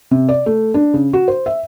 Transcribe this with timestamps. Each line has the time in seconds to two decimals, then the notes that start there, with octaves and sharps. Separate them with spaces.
0.11 C3
0.29 D5
0.46 A3
0.74 D4
0.94 C#3
1.13 F#4
1.28 C5
1.46 E5